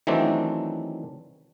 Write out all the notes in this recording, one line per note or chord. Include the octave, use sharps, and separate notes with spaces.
D#3 E3 F#3 A3 C4 D4